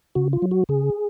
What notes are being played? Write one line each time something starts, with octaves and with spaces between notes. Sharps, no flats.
C#3 F#4
F4
F#3
F#4
C#3 G#4